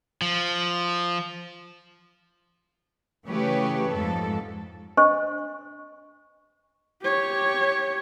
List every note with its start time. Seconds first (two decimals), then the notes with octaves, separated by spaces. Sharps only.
0.22 F3
3.26 C#3 E3 A3 G4 B4 C#5
3.93 F2 G#2 F3 A4
4.97 D4 C5 D#5 C#6
7.03 G4 C#5